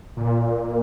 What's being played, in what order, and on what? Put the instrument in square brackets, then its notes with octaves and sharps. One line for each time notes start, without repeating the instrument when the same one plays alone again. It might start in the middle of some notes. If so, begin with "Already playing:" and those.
[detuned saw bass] A#2